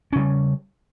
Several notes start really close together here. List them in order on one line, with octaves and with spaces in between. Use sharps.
C#4 C#3 G3